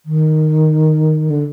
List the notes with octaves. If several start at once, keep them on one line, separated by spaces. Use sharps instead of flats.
D#3
D3